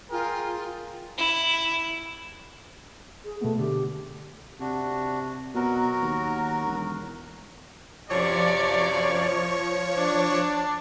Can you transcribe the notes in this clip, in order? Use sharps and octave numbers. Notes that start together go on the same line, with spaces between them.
F4 G#4 A#4 G5
E4
G#4
B2 A3 B3
D3 G4
C3 D4 F#4
B2 F#3 F#4 A#4
D#2
E1
F#2 C3 F3 C#5 D5 C#6
D4